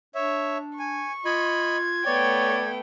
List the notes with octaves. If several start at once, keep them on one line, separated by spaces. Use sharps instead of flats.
D4 C#5 E5
G#5 C#6
F4 D#5 B5 G#6
A3 B3 C#5 D5 G5